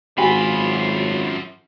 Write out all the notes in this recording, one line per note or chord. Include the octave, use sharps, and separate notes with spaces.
G#1 F#2 F4 F#4 G#5 B5